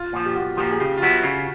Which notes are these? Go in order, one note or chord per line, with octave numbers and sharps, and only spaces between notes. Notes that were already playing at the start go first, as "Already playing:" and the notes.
Already playing: F4
A#2 F3
G4
B1 F#4
A#2 F3 G4
G#4
C#3 G4
F4
F#3 B3 E4 F#4
C#3 F4